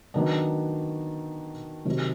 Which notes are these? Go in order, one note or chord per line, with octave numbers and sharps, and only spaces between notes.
D#3 F#3 B3 D4
C3 D#3 F#3